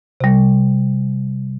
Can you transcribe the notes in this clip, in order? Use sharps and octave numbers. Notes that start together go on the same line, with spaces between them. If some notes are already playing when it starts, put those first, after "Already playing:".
C3 G3